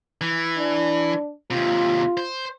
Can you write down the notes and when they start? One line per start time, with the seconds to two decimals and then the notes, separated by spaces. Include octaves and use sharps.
0.21 E3
0.57 D4
1.51 D#2 C3 F4
2.17 C5